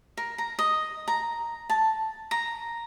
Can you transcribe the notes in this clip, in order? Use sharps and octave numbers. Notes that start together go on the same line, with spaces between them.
A#4
A#5
D#5
A#5
A5
A#5